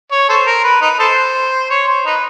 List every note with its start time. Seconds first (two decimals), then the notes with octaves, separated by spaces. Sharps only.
0.11 C#5
0.29 A4 C5
0.47 A#4
0.64 B4
0.82 D#4 B4
0.99 A4 C5
1.70 C#5
1.87 C5
2.06 D#4 B4